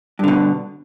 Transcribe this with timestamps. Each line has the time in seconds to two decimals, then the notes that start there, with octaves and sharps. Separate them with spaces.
0.19 G2
0.24 D3
0.28 B2